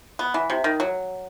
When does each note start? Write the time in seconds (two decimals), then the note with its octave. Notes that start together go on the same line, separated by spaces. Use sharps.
0.19 B3
0.34 E3
0.50 C3
0.64 D#3
0.80 F#3